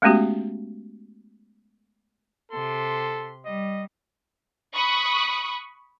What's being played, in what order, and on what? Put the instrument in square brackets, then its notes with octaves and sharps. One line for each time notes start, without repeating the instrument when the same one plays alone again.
[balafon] G#3 A3 B3 C#4 F#4 G4
[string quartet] C3 C6 [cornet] A4
[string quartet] G3 [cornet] D#5
[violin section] B5 C#6 D#6 F#6